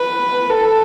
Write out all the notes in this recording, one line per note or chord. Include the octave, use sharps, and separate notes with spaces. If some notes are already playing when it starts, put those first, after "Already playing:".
Already playing: B4
A4